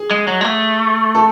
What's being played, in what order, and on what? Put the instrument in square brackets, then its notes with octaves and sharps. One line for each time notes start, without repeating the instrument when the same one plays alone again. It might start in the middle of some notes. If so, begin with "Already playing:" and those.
Already playing: [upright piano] G#4
[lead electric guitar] G#3
F#3
G#3
A3
[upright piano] A4